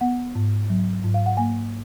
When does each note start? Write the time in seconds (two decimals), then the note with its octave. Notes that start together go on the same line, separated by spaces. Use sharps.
0.01 B3 F#5
0.35 G#2
0.70 F#3
1.04 G#2
1.14 F5
1.26 F#5
1.37 A#3 G#5